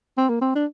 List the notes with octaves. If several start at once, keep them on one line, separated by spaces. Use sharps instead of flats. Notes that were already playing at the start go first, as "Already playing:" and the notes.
C4
A#3
C4
D4